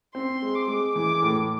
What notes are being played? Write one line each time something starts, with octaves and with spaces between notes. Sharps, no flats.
C4 C6
G#3
D6
G#3
E3 D6
A2